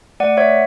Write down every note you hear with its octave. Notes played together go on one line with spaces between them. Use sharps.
A3 D5 F#5
C#5 E5